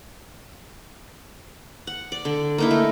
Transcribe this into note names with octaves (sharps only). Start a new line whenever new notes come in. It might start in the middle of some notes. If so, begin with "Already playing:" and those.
F#5
D5
D3
A#3 D#4 E4
A3